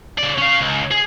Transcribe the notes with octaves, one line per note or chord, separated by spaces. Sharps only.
C#3 D5
C#4 F5
C#2
G#4